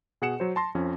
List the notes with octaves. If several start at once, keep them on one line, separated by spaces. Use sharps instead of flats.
B2 G#4 F#5 C#7 E7
F#3 C5
A5 C6 A#6
F2 F3 C#4